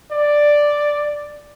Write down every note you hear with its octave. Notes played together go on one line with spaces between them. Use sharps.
D5